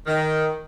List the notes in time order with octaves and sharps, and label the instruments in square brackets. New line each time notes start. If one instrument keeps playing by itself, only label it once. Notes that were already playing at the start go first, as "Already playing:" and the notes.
[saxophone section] D#3